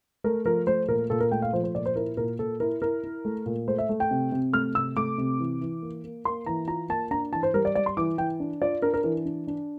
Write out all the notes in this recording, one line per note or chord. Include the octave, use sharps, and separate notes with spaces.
A3 A#4
F3 A#4
A3 C5
A#2 A#4
A#2 A4
A#4
A3 G5
F5
F3 C5
C5
A#2 D5
C5
E4 A#4
A#2 A#4
A#2 A4
E4 A#4
E4 A#4
E4
A3
A#2
A3 C5
E5
A3
G5
C3
C3
A3 F6
C3 E6
A3 D6
C3
E3
E3
A#3
A#3
A#3 C6
E3 A#5
F4 A#5
A#3 A5
D4 A#5
E3 A5
C5
G3 A#4
D5
G3 D5
C6
E3 D6
E3 G5
D4
F4 D5
D4 A#4
A#4
E3 A#4
D4
D4